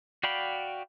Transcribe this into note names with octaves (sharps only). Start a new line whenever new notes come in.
F#4 D5 F5 G5 B5